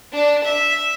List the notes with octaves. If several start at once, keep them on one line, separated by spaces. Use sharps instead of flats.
D4
E5